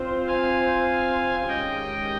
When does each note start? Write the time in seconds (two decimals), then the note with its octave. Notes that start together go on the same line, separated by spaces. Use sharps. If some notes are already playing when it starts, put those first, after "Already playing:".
Already playing: C4 F4 C5
0.27 F5 G#5
1.48 D#3 G#3 C#4 G4 D#5 G5